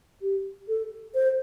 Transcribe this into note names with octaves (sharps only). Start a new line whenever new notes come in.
G4
A4
C5